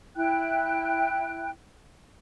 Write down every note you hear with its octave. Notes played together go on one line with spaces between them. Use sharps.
E4 G5 F#6